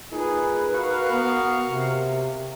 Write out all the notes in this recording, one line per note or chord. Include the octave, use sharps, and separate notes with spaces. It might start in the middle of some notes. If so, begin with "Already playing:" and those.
A#2 D#4 G#4 B4
F#4 A#4 F5
B3
C3